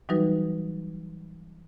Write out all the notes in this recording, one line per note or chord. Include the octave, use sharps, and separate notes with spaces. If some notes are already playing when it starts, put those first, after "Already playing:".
E3 F#3 G3 D#4 F#4 B4